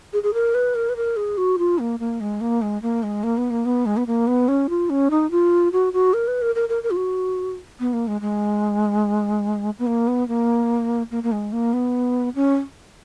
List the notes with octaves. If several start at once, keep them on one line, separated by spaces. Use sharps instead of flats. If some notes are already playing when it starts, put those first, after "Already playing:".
G#4
G#4
A#4
B4
A#4
B4
A#4
G#4
F#4
F4
A#3
A#3
G#3
A#3
G#3
A#3
G#3
A#3
B3
A#3
B3
G#3
B3
A#3
B3
C#4
F4
C#4
D#4
F4
F#4
F#4
A#4
B4
A#4
A#4
A#4
A#4
F4
F#4
B3
A#3
G#3
G#3
B3
A#3
B3
A#3
A#3
A#3
G#3
A#3
B3
C#4